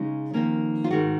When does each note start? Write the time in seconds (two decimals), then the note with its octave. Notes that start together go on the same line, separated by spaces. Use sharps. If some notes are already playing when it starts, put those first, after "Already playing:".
Already playing: C#3 G#3 C#4 D#4
0.34 F2 D#3 A#3 C#4
0.84 F4
0.91 G#2 D#3 G#3 F#4